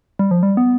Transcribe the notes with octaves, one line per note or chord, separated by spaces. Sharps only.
G3
F3
G3
B3